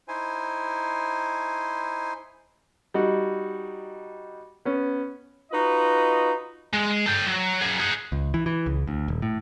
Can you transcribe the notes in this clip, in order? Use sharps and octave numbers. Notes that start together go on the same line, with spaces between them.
D#4 E4 C5 G#5
G3 D#4 F#4
B3 C#4
D#4 F4 F#4 B4 D#5
G#3
A4 G5
F#3
F#3 G#4
G#4 F#5
C#2
E3
E3
C#2
D2
D#1
A2